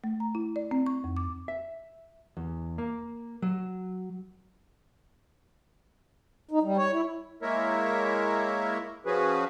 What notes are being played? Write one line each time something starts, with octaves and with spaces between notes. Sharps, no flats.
A3
A#5
E4
D5
C4
C#6
F2
D6
E5
E2
A#3
F#3
D#4
G3
C#5
E4
G#3 A#3 E4 A#4 C#5 E5
F3 C#4 F#4 G#4 B4